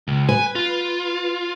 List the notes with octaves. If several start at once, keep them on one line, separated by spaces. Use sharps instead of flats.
C#2
B4 G#5
F4